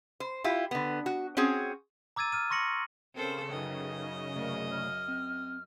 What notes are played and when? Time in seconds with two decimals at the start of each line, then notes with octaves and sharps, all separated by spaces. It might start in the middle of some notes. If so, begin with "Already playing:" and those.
0.20 C5
0.44 E4 F4 G4
0.71 D3 B3
1.06 F#4
1.37 C4 C#4 F#4 G#4
2.16 A#5 D6 E6 G#6 A6 D#7
2.32 F6 D#7
2.50 C6 C#6 A#6 C#7 F#7
3.15 C#3 C4 A4 A#4 C5
3.51 F#2 D#4 A4 B4 D#5 G5
4.36 C3 A3 A#4 D5
4.70 F6
5.08 C4